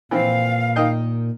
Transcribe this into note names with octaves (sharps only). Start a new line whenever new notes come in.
A#2 E3 F3 C4 F5
D#3 D#5 G5